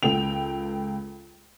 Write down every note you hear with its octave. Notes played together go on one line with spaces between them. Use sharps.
C#2 A4 G5 F7